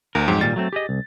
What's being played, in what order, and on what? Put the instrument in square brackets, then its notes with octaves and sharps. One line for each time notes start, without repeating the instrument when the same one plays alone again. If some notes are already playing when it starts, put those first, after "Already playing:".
[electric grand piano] D2 [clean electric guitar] A#4
[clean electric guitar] F2 F#3 G4 [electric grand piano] G#2
[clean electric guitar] A#2 D#3 G3 [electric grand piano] A6
[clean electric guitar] F#3 A3 C4
G4 G#4 D#5
C2